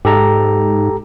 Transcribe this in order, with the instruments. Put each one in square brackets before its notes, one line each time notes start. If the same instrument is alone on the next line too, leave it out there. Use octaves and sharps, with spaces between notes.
[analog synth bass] G#2 [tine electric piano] G4 A4 A#5